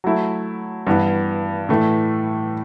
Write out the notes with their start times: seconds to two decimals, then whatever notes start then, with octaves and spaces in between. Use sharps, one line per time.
0.04 F#3 A3 E4
0.87 G2 E3 B3
1.69 A2 E3 A3